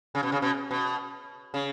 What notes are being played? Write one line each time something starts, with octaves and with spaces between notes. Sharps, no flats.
C#3
B2
C#3
B2
B2
C#3